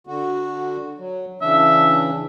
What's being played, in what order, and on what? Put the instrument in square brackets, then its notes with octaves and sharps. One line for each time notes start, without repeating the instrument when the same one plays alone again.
[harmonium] D3 F#4
F#3
[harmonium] C#3 E3 D4 [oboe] E5